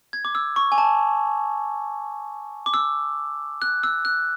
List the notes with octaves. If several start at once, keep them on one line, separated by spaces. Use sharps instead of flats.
G#6
D6
E6
C#6
G#5
A5
D6
E6
F#6
E6
F#6